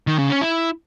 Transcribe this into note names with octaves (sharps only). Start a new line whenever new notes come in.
D#3
C#3
C#4
E4